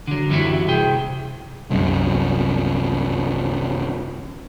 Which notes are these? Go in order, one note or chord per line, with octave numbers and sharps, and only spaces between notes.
D3 F#3
F#2 E3 G3 B3 E4 F#4
C3 G#4 G5
C2 F#2